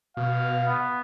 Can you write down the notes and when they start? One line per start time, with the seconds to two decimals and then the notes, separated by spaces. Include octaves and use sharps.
0.17 B2 F5
0.65 B3